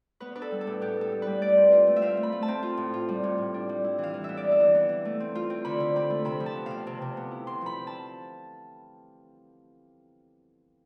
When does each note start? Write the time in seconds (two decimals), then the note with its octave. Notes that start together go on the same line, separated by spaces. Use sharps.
0.20 B3 B4
0.35 D4 B4
0.42 A4
0.51 G3
0.61 A4
0.67 A2
0.81 B3 G4
0.96 B3
1.01 A4
1.12 G3
1.22 G3 B4
1.42 A3 D5
1.57 C4
1.72 F4
1.87 A3
1.96 E5
2.02 C4 F5
2.17 A3
2.23 B5
2.32 A3
2.42 A5
2.48 C4
2.63 F4
2.77 A2
2.94 F4
3.09 G3
3.23 A2
3.38 A2
3.54 D4
3.69 G3
3.84 E4
3.98 E3
4.03 F5
4.14 E3
4.24 B3 E5
4.37 D5
4.44 B3
4.52 E5
4.60 E3
4.75 B3
4.89 E3
5.05 A3
5.20 C4
5.35 F4
5.50 C4
5.65 D3 B5
5.80 D3
5.96 C4 B5
6.10 A3
6.25 C3 B5
6.40 F3
6.46 A5
6.56 B3
6.66 C3 F5
6.87 C3
7.02 C3
7.17 B3
7.31 E4
7.47 C3 C6
7.61 F3 B5
7.77 C4
7.87 A5